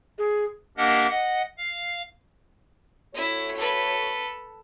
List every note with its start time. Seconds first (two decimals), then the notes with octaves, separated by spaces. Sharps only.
0.18 G#4
0.77 A#3 D4 G4 A#4 D#5 F#5
1.10 D#5 F#5
1.58 F5
3.15 A3 E4 F#4 C#5
3.57 A4 B4